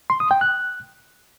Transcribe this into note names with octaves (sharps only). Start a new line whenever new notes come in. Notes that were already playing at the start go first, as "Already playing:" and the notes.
C6
D#6
G5
F#6